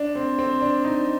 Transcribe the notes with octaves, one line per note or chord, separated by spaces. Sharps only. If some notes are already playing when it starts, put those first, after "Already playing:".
Already playing: D4
C4
C4
D4
D#4